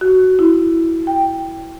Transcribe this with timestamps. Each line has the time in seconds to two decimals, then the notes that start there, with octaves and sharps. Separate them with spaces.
0.01 F#4
0.39 E4
1.07 G5